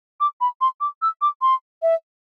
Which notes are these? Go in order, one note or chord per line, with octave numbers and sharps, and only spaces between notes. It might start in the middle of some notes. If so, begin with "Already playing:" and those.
D6
B5
C6
D6
E6
D6
C6
E5